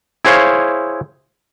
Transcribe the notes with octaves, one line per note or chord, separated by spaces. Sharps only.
E4 G#4 C5 C#5 F5